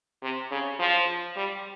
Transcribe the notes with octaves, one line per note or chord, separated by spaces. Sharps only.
C3
C#3
F3
G3